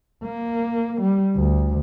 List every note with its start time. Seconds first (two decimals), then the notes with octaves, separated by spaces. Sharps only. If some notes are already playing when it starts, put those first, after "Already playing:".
0.24 A#3
1.01 G3
1.36 D2